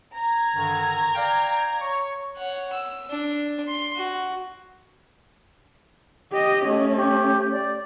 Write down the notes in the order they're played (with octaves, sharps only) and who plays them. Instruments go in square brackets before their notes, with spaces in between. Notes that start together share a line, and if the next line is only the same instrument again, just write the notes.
[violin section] A#5 G#6
[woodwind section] G2 D3 D#3
D5 F5 G5
C#5 C#6
[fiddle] C#5 F#5
E6
D4
C6
F#4
[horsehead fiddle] G4 D#5
[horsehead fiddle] A3 C#4 [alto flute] D#5
[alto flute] G4
D5